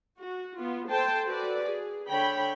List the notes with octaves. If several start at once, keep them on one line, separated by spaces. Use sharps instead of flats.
F#4
B3 F4
A4 C5 G5 A5
F#4 A4 B4 D5
G#4
D3 C#5 G5 B5